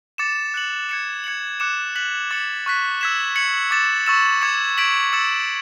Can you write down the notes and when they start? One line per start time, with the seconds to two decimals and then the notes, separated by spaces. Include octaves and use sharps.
0.18 D6 A6 C#7 E7
0.54 F#6 A6 C#7 F#7
0.89 G#6 C#7 E7
1.24 G#6 C#7 F#7
1.60 D6 F#6 C#7 E7
1.95 F#6 B6 F#7
2.31 D6 A6 C#7 F#7
2.66 C#6 F#6 B6
3.01 E6 G#6 B6 E7
3.36 G#6 C#7 F#7
3.71 D6 A6 C#7 E7
4.06 C#6 E6 A6 E7
4.42 D6 G#6 C#7
4.78 G#6 B6 D7 F#7
5.13 E6 A6 C#7 E7